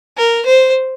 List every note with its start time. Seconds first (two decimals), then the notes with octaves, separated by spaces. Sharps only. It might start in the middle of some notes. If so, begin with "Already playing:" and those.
0.18 A#4
0.46 C5